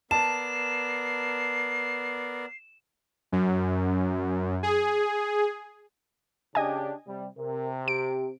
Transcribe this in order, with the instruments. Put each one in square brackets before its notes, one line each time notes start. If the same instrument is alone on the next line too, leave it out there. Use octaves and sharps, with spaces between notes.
[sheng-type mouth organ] B3 A#4 D5 [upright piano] A5 [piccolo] C7 [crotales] E7
[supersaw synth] F#2
G#4
[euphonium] C#3 [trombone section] D4 G4 [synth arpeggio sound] D#5 G#5
[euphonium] C3 [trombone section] G3
[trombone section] C3 [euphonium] A#4
[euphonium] G4 [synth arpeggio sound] D7